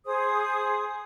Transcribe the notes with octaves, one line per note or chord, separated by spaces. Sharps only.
G#4 C5 D#6